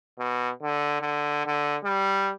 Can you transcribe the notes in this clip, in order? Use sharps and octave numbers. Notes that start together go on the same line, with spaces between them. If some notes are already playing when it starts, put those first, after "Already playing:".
B2
D3
D3
D3
G3